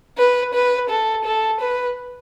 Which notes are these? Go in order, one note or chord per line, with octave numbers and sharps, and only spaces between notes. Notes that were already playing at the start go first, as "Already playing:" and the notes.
B4
B4
A4
A4
B4